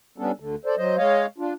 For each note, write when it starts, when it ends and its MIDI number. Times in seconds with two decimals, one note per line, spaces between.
0.18 0.31 55
0.18 0.31 59
0.18 0.31 61
0.18 0.31 62
0.18 0.31 69
0.40 0.55 38
0.40 0.55 50
0.40 0.55 57
0.65 0.75 69
0.65 0.75 72
0.65 0.75 74
0.77 0.97 54
0.77 0.97 72
0.77 0.97 75
0.97 1.26 56
0.97 1.26 73
0.97 1.26 75
0.97 1.26 77
1.38 1.54 62
1.38 1.54 65